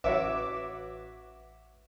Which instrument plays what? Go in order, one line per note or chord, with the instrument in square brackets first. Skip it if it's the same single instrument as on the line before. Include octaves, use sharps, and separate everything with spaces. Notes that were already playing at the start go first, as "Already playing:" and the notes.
[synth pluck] A1 B4 D6 [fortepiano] F#4 C#5 E5